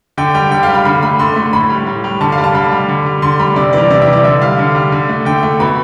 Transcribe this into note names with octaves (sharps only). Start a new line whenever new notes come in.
D3 G5
G3 G5
D3 G5
F5
G3
B5
D3 B5
A3 B5
D3 C6
A3
A2 B5
G3
A2
G3
D3 A5
F5
G3
A5
D3 B5
G3
D3
G3
D3 C6
G3 B5
C3 D5
E3 G3 D5
C3 D5
E5
E3 G3
D5
D3 E5
G3 F5
D3
G3
D3
A3
D3 G5
A3
B2 B5